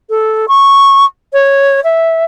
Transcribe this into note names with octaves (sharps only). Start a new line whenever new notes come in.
A4
C#6
C#5
E5